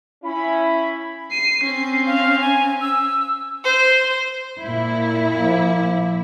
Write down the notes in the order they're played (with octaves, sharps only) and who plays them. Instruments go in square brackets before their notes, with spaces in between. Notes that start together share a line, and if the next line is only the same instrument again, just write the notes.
[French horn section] C#4 E4 [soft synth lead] B5
[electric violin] C7 [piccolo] D#7
[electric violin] C4 C#4 [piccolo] C7
[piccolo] F5
G#5
E6
[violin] C5
[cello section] A#2 E4
[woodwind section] F3 A#3